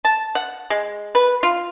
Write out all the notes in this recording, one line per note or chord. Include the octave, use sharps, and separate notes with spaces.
A5
F#5
G#3
B4
F4